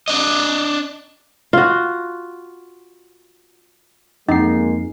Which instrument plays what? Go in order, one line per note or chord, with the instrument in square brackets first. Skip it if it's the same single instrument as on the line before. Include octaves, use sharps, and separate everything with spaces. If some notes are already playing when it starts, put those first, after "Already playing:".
[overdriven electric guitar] D4 D#5
[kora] F4 F#4
[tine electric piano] F2 C7 [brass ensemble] G#3 A#3 [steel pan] D#4